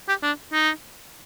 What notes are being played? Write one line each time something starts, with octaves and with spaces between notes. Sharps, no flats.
G4
D4
D#4